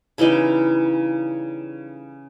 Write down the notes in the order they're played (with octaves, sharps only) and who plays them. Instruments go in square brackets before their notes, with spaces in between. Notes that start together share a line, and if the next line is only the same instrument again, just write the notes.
[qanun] C#3 E3 G3 D#4